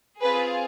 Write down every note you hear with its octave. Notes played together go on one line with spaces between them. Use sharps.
C4 F4 G#4 B4